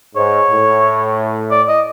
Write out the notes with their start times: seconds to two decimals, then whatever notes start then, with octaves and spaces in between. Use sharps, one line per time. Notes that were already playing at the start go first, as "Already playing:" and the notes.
0.16 G#2 C#5
0.50 A2
1.51 D5
1.69 D#5